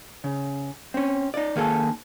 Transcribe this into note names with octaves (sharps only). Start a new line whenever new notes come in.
C#3
C4 C#4
D#4 D5
D#3 A#3 G#4 A4